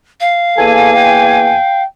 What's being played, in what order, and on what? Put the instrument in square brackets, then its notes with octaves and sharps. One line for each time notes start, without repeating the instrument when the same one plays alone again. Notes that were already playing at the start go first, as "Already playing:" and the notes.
[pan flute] F5
[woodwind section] E2 A#3 G#5 [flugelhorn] A4
[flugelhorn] G5